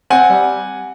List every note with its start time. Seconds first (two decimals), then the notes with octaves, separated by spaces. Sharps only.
0.10 C4 F#5 G#5
0.29 G3